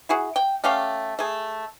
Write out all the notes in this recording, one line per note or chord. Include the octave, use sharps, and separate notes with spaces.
E4 F#4 G#4
G5
A3 C#4 G4 F5
A3 G#4